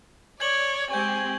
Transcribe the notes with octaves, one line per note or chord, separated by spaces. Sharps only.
C#5 D5 G#6 F#7
G#3 C4 G4 G#5 C#6 G6